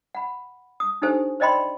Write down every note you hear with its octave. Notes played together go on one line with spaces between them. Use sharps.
F#5 B5
D#6
D4 D#4 G4 A4 C5 G#5
C5 D5 D#5 G5 B5 C6